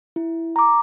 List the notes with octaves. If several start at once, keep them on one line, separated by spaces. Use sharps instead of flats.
E4
A#5 D6